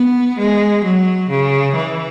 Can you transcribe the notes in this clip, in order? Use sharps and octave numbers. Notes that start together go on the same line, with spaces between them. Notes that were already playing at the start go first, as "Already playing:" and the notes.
Already playing: B3
G#3
F#3
C#3
E3